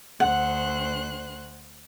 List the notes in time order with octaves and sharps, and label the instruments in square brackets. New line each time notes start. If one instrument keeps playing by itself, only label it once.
[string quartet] D2 C5 F#6 [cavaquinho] F#5